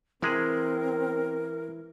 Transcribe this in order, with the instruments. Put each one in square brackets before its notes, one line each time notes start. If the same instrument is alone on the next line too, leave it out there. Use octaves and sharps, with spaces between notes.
[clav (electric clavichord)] C3 G#3 G#4 [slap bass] E3 [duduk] C4 [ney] A#4